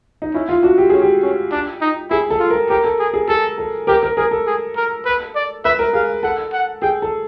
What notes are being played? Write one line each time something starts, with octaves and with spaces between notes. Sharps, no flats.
D#4
C#4 E4
F4
D4 F#4
G4
C#4 G#4
G4
C#4
D4
D#4
E4 G#4
A4
F4
A#4
G4 A#4
A4
G#4
G#4
G#4 A4
A4
G4 A#4
A#4
G#4 A#4
A4
G#4
A#4
B4
D5
B4 E5
A#4
G#4 F5
A4 F#5
F#5
G#4 G5
A4